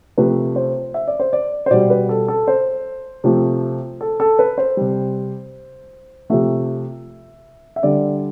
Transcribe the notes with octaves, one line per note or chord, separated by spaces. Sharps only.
C3 F3 A3 B4
C5
E5
D5
C5
D5
C5
B2 G3 D5
B4
A4
A4
C5
C3 F3 A3
A4
A4
B4
C5
C3 G3
C3 F3 A3 E5
E5
D3 G3 D5